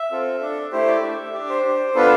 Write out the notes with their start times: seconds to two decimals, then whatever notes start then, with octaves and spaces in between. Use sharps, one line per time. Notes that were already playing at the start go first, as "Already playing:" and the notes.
Already playing: E5
0.12 C4 F4 A4
0.41 D4 A4
0.72 A3 E4 G4 C5
0.88 D5
1.03 D4 A4 E5
1.33 D4 G4 D5
1.50 C5
1.64 D4 G4
1.95 B3 D4 F4 A4 B4